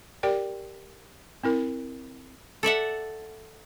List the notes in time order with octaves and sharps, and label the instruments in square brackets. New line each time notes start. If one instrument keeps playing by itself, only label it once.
[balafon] G4 A#4 D5 G5
C4 E4 A#4
[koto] A4 D5 E5 F#5